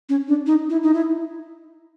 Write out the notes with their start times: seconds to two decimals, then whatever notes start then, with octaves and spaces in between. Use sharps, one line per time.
0.09 C#4
0.28 D4
0.47 D#4
0.70 E4
0.83 D#4
0.94 E4